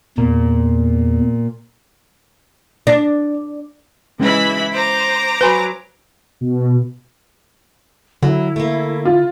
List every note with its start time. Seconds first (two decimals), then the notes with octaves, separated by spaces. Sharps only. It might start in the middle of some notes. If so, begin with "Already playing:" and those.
0.18 E2 A#2
2.87 D4
4.20 E3 G#3 C#4 E4 B5
4.73 C5 A#5 D6
5.41 F#3 B4 C5 G#5 B5
6.41 B2
8.23 D3 F#3 E4
8.56 A3 A#3
9.05 F4